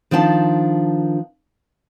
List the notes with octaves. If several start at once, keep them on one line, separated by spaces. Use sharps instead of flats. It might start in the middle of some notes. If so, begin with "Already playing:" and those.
D#3 F3 D4 G5 A5